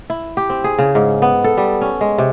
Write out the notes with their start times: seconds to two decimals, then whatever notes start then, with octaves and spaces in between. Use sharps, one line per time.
0.10 E4
0.37 G4
0.50 C4
0.64 G#4
0.79 C#3
0.95 G#2
1.22 B3
1.44 A4
1.57 G3
1.81 C#4
2.01 G#3
2.18 C3